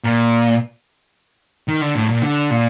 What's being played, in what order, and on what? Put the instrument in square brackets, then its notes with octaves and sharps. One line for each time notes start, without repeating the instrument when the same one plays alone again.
[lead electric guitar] A#2
D#3
D3
A2
A#2
D3
A#2